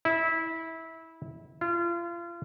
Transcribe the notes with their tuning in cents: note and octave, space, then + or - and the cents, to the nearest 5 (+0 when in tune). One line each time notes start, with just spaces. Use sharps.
E4 -20
F4 -30